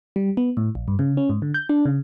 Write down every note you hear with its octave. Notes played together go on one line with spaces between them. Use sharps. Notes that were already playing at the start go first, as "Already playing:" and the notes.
G3
B3
A2
A#1
G2
C#3
C#4
G#2
D3
G6
D4
C#3